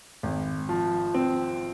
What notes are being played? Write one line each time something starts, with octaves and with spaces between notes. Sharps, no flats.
G#1
F3
C4